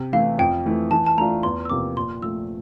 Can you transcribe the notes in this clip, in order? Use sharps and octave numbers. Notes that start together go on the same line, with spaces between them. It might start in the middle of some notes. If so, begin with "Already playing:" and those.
Already playing: C3
E3 A3 E4 F5
F2 G5
E3 A3 E4
E3 A5
A5
A3 D4 F4 A#5
E2 C6
E6
C3 F3 A#3 D6
A#2 C6
F3 A3 E6